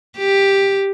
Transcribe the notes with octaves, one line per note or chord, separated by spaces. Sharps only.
G4